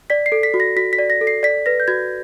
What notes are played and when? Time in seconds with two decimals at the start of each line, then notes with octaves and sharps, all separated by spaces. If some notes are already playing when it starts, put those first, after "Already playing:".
0.10 D5 B6
0.26 C7
0.32 A4
0.43 B6
0.54 F#4
0.60 A#6
0.77 F#4 B6
0.93 B6
0.99 D5
1.10 A#6
1.21 A4
1.27 C7
1.43 D5 B6
1.66 B4 A#6
1.80 G6
1.88 F#4 G#6